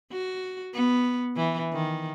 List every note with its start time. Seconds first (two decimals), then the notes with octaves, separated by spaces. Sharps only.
0.12 F#4
0.74 B3
1.37 E3
1.73 D#3